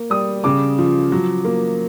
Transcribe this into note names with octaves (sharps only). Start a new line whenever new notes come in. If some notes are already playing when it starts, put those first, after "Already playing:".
Already playing: A#3
G3 D#6
C#3 D6
F3
F#3
A#3